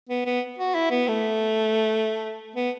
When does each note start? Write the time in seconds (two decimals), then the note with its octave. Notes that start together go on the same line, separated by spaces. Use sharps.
0.09 B3
0.26 B3
0.58 F#4
0.74 E4
0.91 B3
1.08 A3
2.55 B3